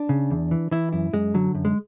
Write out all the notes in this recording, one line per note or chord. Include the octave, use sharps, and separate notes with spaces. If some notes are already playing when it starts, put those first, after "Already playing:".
Already playing: D4
C#3
E2
E3
E3 E4
F#2 E4
F#2 G#3
D3 F#3
F#2
G#3